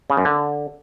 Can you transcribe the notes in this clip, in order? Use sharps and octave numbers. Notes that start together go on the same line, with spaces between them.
C#3
F#2
D3